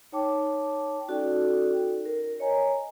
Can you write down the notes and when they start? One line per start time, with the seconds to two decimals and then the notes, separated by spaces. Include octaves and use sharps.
0.12 D#4 C#5 G5 A5 D6
1.08 C#4 D#4 F#4 A4 D5 G5
2.06 A#4
2.40 C#5 D#5 G#5 A#5